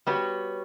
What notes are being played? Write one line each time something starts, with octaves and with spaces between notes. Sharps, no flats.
G3 B3 F#4 C#5